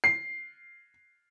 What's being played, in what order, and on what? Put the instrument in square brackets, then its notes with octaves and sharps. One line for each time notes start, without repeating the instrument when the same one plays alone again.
[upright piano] C7